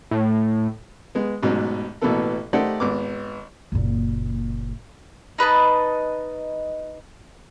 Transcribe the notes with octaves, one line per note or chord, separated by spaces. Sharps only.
A2
G#3 B3
A1 G#2 B2 F#3
A1 B2 E3 A#3 B3 A4
A3 D#4 G4 C5 D5 F#5
G#1 B3 D6
F#1 A#2
D#4 B4 D#5 A5